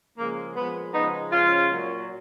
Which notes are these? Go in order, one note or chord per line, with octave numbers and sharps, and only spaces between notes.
C#3 F3 G#3 A#3
A#2 F3 G#3 B3
C#3 F3 G#3 B3 D#4
C#3 F3 G#3 C#4 F4
A#2 F#3